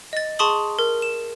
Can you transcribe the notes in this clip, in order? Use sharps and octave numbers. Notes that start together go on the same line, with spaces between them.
D#5 A6
G#4 A5 C6 C#6 D#6 F#7
A#4
E7